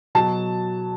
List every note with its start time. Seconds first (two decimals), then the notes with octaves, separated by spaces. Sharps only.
0.15 B2 F#3 A5